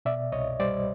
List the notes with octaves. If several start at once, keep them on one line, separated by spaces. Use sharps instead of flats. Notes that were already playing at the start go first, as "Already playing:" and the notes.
B2 D5 E5
C2 C#5 D#5
G3 C5 D5